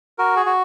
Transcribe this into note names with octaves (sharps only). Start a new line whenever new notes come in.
F#4 A#4
G#4
F#4